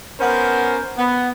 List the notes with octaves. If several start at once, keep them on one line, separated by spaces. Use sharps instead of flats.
B3 C#4 A#4 C5
B3